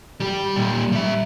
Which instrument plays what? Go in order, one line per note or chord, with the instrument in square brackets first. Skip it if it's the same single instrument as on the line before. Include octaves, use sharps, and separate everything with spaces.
[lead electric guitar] G3 G4
A#2 G3
G3 E5